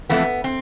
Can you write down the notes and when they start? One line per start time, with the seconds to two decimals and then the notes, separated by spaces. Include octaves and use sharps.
0.09 F2 E3 A3 B3
0.44 C4